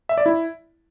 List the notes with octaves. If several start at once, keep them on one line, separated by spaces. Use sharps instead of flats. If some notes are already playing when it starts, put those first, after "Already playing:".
E5
D5
E4